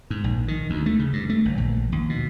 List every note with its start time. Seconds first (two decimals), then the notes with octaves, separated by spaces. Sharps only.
0.10 G#2
0.24 A#1
0.48 D#3
0.70 D2
0.86 A3
0.99 C#3
1.13 G2
1.30 A3
1.45 G1
1.58 A#1
1.92 D#2
2.09 B2